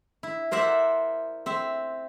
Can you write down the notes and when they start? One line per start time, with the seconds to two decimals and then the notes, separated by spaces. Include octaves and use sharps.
0.23 E4
0.51 A#4 C5 D5 E5 F#5
1.46 C4 E5